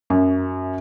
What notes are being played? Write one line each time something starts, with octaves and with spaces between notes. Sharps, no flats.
F#2